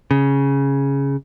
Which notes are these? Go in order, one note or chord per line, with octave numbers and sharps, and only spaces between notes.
C#3